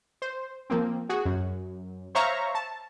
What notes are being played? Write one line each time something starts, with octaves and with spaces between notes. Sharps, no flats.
C5
F3 A#3 C4
F#4 G#4
F#2
C5 C#5 E5 F5 A#5 C#6
A5